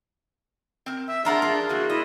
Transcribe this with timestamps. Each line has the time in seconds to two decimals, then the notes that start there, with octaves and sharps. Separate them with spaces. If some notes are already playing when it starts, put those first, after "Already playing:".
0.86 C4 A#4
1.08 E5
1.25 D4 F4 G#4 A#4 E5 F#5 A#5
1.42 F4
1.69 E3 G3 A#3 F#4
1.90 E4 D#5